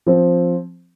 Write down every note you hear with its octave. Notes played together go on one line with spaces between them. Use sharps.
F3 C4